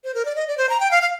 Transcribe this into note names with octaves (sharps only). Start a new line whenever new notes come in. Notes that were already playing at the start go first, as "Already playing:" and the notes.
C5
A#4
D5
D#5
D5
C5
A#5
G5
F5
F5